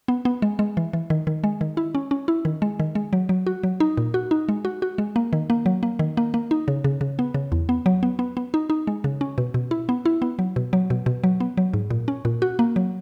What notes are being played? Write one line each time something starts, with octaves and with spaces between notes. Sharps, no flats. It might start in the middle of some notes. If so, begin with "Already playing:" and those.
B3
B3
G#3
G#3
E3
E3
D#3
D#3
G#3
D#3
E4
C#4
C#4
E4
D#3
G#3
D#3
G#3
F#3
F#3
F#4
F#3
D#4
A#2
F#4
D#4
G#3
F#4
F#4
G#3
A#3
D#3
A#3
F#3
A#3
D#3
A#3
A#3
D#4
C#3
C#3
C#3
B3
C#3
E2
B3
F#3
B3
B3
B3
D#4
D#4
G#3
C#3
C#4
B2
B2
E4
B3
E4
B3
F#3
B2
F#3
B2
B2
F#3
B3
F#3
G#2
A#2
C#4
A#2
F#4
A#3
F#3